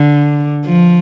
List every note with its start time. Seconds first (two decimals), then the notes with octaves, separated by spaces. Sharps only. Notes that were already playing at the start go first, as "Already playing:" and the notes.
Already playing: D3
0.66 F3